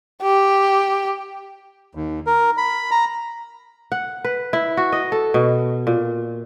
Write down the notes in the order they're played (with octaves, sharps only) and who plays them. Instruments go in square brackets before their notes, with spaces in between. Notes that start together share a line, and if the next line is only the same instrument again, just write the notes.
[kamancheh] G4
[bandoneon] D#2
A#4
B5
A#5
[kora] F#5
B4
E4
F#4
D#5
A4
B2
A#2